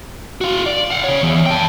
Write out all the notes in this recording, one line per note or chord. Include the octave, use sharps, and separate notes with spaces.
F#4 F5
D5
F5 F#5
C#3 C#5
E2
G5 A5